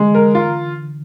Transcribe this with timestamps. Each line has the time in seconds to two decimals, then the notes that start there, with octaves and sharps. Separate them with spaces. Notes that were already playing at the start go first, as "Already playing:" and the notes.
Already playing: D3 E3 G#3
0.15 A#4
0.35 F4